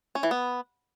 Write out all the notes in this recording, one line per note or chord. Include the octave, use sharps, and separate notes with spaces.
C#4
E3
B3